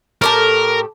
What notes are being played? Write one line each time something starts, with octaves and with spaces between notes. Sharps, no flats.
A2 G4 A4 A#4